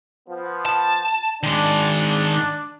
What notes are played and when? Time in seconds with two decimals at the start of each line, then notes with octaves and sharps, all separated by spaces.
0.28 F3 B3
0.65 A5
1.43 D#3 G#3 D4